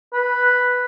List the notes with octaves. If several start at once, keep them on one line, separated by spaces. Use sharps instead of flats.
B4